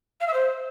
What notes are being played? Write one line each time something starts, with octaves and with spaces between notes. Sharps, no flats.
F5
E5
C5